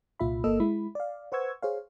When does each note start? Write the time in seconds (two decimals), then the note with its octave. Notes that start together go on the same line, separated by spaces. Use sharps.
0.20 C2 A#2 F4 E5 B5
0.44 G1 A#3 A4 D#5 E6
0.60 G#3 E4 B5
0.95 D5 F5
1.32 B4 C5 F#5 C#6 E6 G#6
1.62 G#4 C5 C#5 F5